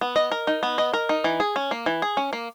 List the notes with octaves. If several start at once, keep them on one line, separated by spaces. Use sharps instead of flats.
B3
D#5
A#4
D#4
B3
D#5
A#4
D#4
E3
G#4
C#4
A#3
E3
G#4
C#4
A#3